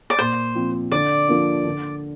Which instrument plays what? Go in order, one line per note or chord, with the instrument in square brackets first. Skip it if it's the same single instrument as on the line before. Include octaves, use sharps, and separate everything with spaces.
[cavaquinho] D5
[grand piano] A#2 [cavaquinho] C5
[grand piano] F3 C4
[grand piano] D3 [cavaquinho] D5
[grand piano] F3 A#3 D4
D3